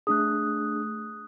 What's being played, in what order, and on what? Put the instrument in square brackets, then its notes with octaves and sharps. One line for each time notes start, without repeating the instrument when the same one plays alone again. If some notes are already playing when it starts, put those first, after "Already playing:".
[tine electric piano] A3 D4 G#4 [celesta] D#6 F#6